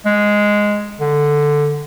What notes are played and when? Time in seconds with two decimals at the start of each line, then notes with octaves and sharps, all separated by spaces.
0.05 G#3
1.00 D3